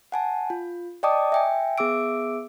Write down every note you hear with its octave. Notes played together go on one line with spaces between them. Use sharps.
F#5 G#5 A5
F4
D5 D#5 G5 A5 D6 D#6
E5 G5 G#5
B3 G#4 E5 D6 E6 D7